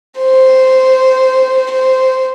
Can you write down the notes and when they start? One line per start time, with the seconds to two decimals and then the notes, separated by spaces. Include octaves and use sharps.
0.18 C5
1.71 C5